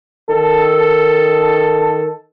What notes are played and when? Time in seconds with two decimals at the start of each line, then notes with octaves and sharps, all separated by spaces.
0.30 D#3 A4